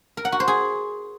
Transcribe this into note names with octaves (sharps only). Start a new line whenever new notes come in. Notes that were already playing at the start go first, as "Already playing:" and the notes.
A#4
F#5
F#4
C5
G#4